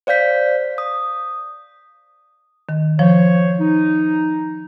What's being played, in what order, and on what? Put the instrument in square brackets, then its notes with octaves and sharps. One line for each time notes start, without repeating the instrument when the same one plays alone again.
[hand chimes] C5 D5 F5 G6 B6
D#6
[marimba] D#3
[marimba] F3 [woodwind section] C5 C#5
[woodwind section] D#4